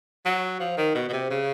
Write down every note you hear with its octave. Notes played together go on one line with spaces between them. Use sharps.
F#3
F3
D#3
B2
B2
C3
C#3